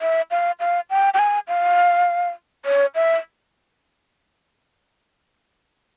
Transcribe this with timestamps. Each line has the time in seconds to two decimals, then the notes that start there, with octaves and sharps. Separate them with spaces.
0.01 E5
0.31 F5
0.60 F5
0.90 G5
1.14 G5
1.19 G#5
1.48 F5
2.65 C#5
2.95 E5